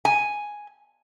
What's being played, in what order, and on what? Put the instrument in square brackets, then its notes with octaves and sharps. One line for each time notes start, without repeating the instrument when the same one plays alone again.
[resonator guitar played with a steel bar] G#5